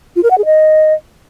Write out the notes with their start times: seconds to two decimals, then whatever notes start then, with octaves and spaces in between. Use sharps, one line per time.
0.16 F4
0.23 A#4
0.30 F#5
0.38 G#4
0.45 D#5